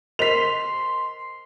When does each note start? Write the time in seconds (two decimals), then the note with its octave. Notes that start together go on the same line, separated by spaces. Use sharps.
0.19 A#4 C5 D#5 C6 B6 F7